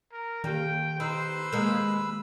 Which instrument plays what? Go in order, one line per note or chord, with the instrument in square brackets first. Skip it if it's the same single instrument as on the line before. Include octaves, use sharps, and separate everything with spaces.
[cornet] A#4
[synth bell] D#3 G4 [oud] A#3 [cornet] G5
[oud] D#4 [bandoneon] B4 B5 E6 [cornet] C5
[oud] G#3 A#3